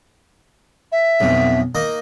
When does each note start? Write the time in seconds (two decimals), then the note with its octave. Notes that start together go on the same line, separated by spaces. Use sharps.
0.92 E5
1.20 B1 F2 B2
1.75 A#3 D#4 D#5